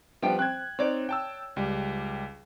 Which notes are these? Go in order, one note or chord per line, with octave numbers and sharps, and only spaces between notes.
F3 G3 B3 D4 G5
C4 F#6 G#6
C4 D#4 C#5 D5
G5 A5 E6
C#2 G3